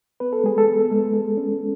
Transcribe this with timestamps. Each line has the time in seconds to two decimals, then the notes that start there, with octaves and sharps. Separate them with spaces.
0.20 B3 B4
0.33 A4
0.44 G#3 G#4
0.58 A4
0.67 B3
0.91 G#3
1.14 G#3
1.37 C#4